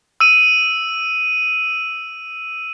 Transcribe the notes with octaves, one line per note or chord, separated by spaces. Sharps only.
E6 D#7